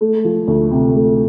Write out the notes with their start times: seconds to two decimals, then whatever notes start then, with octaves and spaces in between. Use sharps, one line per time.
0.01 A3
0.25 F3
0.48 D2
0.71 C3
0.95 A3